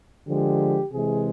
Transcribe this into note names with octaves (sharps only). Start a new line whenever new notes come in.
D3 F3 G#3 G4
C3 E3 G#3 G#4